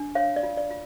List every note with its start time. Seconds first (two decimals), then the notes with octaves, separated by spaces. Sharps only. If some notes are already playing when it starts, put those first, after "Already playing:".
Already playing: D4
0.15 C#5 F5
0.36 D5
0.43 F4
0.57 D5
0.71 F4